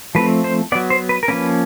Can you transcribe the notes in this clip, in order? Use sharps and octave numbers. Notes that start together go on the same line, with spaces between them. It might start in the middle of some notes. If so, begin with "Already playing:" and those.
F3 A3 C4 B4
C5
F#3 B3 D5
C5
B4
A#4
F3 A#3 C#4 B4